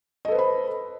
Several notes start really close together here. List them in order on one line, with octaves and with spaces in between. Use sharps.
D#5 A4 B4 C5 B5